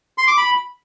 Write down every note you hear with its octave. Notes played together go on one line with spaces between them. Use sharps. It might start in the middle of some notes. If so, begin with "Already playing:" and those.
C6
D6
B5